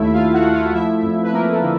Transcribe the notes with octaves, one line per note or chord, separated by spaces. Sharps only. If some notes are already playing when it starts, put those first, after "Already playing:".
Already playing: D#2 A3 E4 E5
D#2 F4 F5
F#4 F#5
A3
F4 F5
F3 E4 E5
F2
B4
F3 A#3 A#4
A3 A4
D3